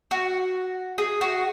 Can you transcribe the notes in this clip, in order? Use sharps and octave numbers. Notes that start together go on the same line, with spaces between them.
F#4
G#4
F#4